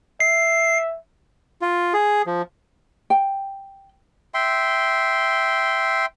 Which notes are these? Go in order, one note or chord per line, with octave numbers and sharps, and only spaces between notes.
E5 C7
F4
G#4
F3
G5
E5 G5 C6